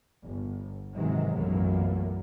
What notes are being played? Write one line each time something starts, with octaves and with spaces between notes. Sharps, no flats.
G1
G#2 C3 D#3 E3 F#3 G#3
B1 F#2 A#2 E3 A3 A#3